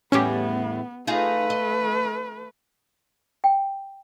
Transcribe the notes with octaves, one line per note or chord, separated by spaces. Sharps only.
E2 A2 G3 B3 C#4 G4
A3 D#4 F4 G#4 B4
D#5
G5